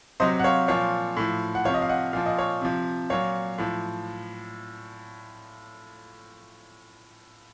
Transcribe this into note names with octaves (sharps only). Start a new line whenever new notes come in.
C3 F#3 C5 D#5
F#5
C#5 F5
A#2 F3 C#5 F5
A2 F3
F#5
C3 F3 C#5 F5
D#5
F5
D#5 F#5
A#2 F3 F5
D#5
C#5 F5
C3 F3
A#2 F#3 C#5 F5
A2 F3